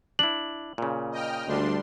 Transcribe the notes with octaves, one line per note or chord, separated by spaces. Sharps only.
D4 E4 F#7
A#2 C#3
D#5 G5 F6
D2 G3 D4 C6